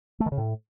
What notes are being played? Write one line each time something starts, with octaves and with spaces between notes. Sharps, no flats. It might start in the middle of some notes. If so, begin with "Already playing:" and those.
A3
D#3
C#3
A2